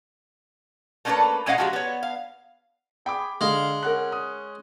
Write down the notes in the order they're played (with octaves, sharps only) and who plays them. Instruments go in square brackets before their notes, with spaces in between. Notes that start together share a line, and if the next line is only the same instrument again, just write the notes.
[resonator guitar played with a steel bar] A3 A#3 C#4 D4 A4 B4
A#2 G#3 C#4 D#5 F5 F#5
F3 F#3 G#3 F#4 G4
B3 C#5
F5
[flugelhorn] G#4 [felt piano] G5 B5 D6
[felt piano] D3 [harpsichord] G#3 [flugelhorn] F5
[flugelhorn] C#4 [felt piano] A#4 F#5 F#6
[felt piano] D#6